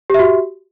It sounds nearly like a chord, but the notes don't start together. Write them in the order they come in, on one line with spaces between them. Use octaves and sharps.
G4 E5 F#4